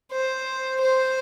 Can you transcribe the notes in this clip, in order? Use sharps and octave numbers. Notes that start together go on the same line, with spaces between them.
C5
C5